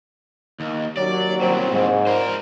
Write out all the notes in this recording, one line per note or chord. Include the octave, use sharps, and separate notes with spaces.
D#2
D#2 F#3 C#4 D5
C2 A#2 C4
G#2
A#2 A#4 C5